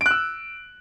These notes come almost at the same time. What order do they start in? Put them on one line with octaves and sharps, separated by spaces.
D7 F#6 E6